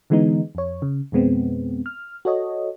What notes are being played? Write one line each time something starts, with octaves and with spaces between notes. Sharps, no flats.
D3 E3 G#3 B3 D#4
F2 C#5
C#3
F2 B2 G#3 B3 C4
F6
F#4 A4 C#5 D#5